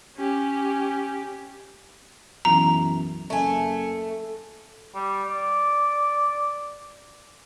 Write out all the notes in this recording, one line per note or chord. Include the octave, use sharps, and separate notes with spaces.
C#4 G4
B1 F#2 E3 A#5
F#1 A3 G#5
G3
D5